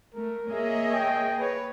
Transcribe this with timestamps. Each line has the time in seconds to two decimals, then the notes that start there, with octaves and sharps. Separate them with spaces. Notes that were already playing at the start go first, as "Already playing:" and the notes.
0.15 A3 A#4
0.50 A#3 G#4 C#5 D#5 E5
0.93 G5
1.38 B4 C#5